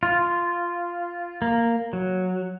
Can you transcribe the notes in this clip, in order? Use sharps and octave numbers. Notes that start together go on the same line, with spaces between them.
F4
A#3
F#3